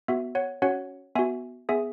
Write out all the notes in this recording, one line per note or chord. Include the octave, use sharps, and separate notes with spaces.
B3 F#4 E5
C#5 F#5
C#4 F#4 C#5 F#5
B3 F#4 E5 G#5
B3 G#4 E5 G#5